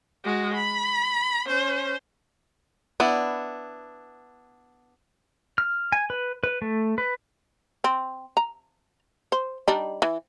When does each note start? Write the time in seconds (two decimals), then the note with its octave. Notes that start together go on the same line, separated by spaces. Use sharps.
0.24 G#3 F#4
0.54 B5
1.47 C#4 C5
3.00 B3 D4 E4
5.58 F6
5.92 G#5
6.10 B4
6.44 B4
6.62 A3
6.98 B4
7.84 C4
8.37 A#5
9.32 C5
9.68 G3 D4 D#4
10.02 E3